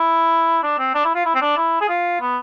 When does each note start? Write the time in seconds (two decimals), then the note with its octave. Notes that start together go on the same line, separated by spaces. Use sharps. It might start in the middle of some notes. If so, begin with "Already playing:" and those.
Already playing: E4
0.63 D4
0.78 C4
0.95 D4
1.05 E4
1.15 F4
1.26 E4
1.35 C4
1.41 D4
1.57 E4
1.81 G#4
1.89 F4
2.21 B3